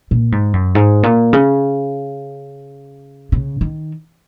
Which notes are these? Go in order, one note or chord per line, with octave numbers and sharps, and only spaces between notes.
A#2
G#2
F#2
G#2
A#2
C#3
C#3
D#3